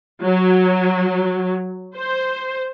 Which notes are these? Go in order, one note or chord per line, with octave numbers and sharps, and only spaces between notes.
F#3
C5